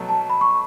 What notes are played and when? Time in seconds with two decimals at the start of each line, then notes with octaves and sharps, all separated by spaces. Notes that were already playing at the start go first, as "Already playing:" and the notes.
Already playing: B2 F#3 A3
0.09 A5
0.30 B5
0.41 C#6